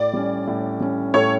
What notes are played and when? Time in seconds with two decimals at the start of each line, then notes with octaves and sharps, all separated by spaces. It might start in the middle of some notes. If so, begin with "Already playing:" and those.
Already playing: A2 D5
0.13 G3 C#4
0.47 A2
0.80 G3 C#4
1.14 A2 A4 C#5